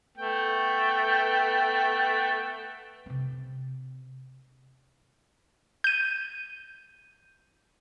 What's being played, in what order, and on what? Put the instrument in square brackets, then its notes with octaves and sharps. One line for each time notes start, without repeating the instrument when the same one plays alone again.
[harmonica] A3 B3 G5
[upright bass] C3 C4
[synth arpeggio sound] G6 D#7